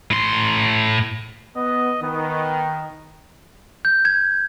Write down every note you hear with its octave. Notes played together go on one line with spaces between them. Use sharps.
A2 C6
B3 D#5
D#3 B3
G6
G#6